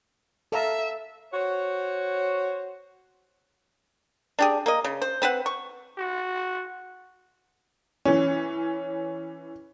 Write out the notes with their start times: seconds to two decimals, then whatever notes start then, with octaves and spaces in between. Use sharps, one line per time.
0.52 A4 E5 F5 A#5
1.33 F#4 C5 C#5
4.39 D4 G4 G#4
4.66 A#3 D#5
4.84 C#3
5.02 C5
5.22 C4 B4 C5 F#5
5.46 C#6
5.98 F#4
8.05 E3 C#4